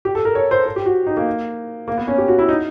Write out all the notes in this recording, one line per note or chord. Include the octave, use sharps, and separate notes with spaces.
G4
A4
A#4
C#5
C5
C5
G4
F#4
D#4
A#3
A#3
B3
C#4
G4
F#4
E4
D#4